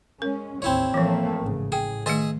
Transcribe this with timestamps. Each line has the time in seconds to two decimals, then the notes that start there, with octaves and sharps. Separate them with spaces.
0.22 G#3 C#4 A#4
0.62 A1 D#2 C4 E4 C#5
0.94 E3 F3 A3 A#3
1.40 A1 G#2 C#3
1.72 A2 G#4 G5
2.06 D#3 A3 G#4 D#5 E5